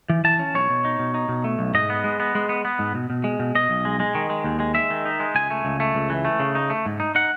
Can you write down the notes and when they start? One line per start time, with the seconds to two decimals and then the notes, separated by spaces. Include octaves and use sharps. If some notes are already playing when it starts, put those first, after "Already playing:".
0.10 E3
0.24 E3 A5
0.39 C#4
0.55 B1 C#5
0.70 B2
0.85 D#4
0.99 B2
1.14 D#4
1.29 B2
1.44 A3
1.59 B1
1.74 G#2 D#5
1.90 B3
2.04 G#3
2.20 B3
2.35 G#3
2.49 B3
2.65 B3
2.79 G#2
2.95 B2
3.10 B2
3.24 G#3
3.40 B2
3.55 B2 D#5
3.70 B1
3.85 G#3
4.00 G#3
4.15 D#3
4.30 G#3
4.44 D#2
4.60 G#3
4.75 G#3 E5
4.90 D#3
5.06 D#4
5.20 G#3
5.35 C#2 G#5
5.51 A3
5.65 C#2
5.80 A3
5.95 C#2
6.10 E3
6.25 A3
6.40 C#3
6.55 D#4
6.70 A3
6.86 G#2
7.00 D#4
7.15 D#4 F#5